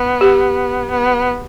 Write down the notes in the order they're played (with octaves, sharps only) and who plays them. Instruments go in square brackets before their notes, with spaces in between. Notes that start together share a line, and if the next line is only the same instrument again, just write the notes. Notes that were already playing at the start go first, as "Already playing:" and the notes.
Already playing: [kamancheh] B3
[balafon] G4
[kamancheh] B3